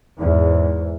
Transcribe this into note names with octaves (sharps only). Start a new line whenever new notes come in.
E2 G#2